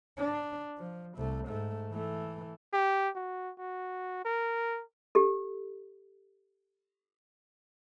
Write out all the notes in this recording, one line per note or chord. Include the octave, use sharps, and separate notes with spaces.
D4
F3
C2 A3
G#2 A3
E3 A3
G4
F#4
F#4
A#4
G4 A4